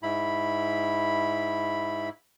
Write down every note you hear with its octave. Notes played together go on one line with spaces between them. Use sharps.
G#2 E4 B5